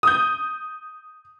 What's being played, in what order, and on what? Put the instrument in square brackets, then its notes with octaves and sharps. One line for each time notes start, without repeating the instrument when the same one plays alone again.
[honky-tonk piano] D#6 G6